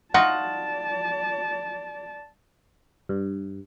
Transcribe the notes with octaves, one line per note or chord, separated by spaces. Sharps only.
D#4 F4 F#4 D5 F#5 A5
G2